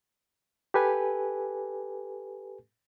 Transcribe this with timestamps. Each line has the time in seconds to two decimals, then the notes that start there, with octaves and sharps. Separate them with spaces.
0.74 G4 A4 B4 G#5